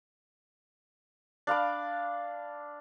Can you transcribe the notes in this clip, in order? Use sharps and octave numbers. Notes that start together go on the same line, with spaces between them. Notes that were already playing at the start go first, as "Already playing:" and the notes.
D4 F5 B5 D6